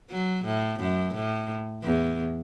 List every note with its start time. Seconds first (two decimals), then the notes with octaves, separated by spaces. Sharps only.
0.11 F#3
0.45 A2
0.80 F#2
1.14 A2
1.83 E2